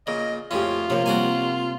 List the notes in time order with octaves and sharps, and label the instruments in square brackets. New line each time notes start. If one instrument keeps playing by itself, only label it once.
[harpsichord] A#2 C#3 [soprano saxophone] D#5
[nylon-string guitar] F2 G4 [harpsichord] A2 C#3 C#4 [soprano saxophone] F4
[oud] C3 A#3 [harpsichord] F3 [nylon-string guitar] D4 B4 C#5
[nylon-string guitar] G3 [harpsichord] F#4 D5 G#5